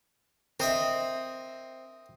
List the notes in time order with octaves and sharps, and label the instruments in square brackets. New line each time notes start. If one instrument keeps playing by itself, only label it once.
[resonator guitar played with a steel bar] C4 [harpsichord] A#4 D#5 E5